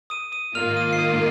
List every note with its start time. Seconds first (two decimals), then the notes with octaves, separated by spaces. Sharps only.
0.10 D#6 D#7
0.32 D#6 D#7
0.54 G#2 D#3 A#3 F4 F6 F7
0.77 D#6 D#7
0.93 C7
0.99 D#6 D#7